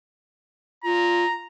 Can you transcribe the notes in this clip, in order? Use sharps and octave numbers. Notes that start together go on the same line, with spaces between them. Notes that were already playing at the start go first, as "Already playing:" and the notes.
F4 A#5